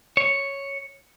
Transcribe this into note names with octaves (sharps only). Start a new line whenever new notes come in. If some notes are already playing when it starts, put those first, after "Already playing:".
C#5